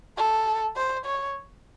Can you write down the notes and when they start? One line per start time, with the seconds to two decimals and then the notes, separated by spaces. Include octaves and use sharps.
0.17 A4
0.76 C5
1.06 C#5